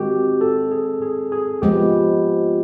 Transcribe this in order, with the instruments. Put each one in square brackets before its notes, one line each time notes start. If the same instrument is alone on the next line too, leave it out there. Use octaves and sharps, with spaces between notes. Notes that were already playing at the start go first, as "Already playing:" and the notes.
Already playing: [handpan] D#3 G#3 C4 [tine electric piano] F#4 G4
[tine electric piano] A4
G#4
G#4
G#4
[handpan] F3 G#3 B3 [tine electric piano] G4